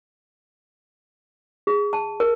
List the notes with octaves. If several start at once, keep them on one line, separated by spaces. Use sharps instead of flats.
G#4
A5
A#4